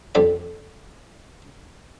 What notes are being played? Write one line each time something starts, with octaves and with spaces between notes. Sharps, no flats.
F2 D3 G3 D4 B5